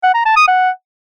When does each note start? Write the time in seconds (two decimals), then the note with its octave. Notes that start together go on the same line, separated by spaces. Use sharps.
0.03 F#5
0.14 A#5
0.25 A5
0.36 D#6
0.48 F#5